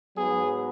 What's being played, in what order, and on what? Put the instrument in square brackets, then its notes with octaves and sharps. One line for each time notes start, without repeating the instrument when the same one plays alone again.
[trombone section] G#2 F#3 B3 G#4